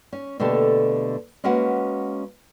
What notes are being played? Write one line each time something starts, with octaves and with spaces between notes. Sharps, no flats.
C#4
B2 D3 A3 A#3 G4 A4
G#3 A#3 C#4 F#4 B4 F#5